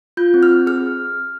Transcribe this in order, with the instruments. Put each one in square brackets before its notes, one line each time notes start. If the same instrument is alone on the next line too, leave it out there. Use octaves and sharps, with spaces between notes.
[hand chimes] F4 G6
C4
F6
C4
G#4 F6